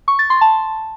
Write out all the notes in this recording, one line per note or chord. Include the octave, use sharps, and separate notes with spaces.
C#6
A6
C6
A5